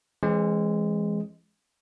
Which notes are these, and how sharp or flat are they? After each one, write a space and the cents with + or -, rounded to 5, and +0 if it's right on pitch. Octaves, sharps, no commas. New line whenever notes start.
E3 +20 G#3 +0 C4 +45